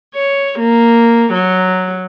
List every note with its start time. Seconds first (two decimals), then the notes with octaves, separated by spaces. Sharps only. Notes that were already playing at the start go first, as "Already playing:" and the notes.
0.12 C#5
0.56 A#3
1.31 F#3